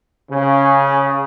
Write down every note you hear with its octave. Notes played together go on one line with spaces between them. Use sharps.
C#3